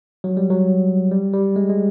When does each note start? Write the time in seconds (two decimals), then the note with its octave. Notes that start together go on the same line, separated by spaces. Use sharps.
0.24 F#3
0.37 G3
0.50 F#3
1.11 G3
1.33 G3
1.56 G#3
1.70 G#3